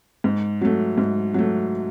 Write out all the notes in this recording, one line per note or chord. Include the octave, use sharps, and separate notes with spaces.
G#2
F#3 A3
G#2
F#3 A3